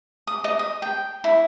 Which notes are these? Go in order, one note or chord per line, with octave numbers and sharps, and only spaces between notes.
D#6
D#5
D#6
G5
E4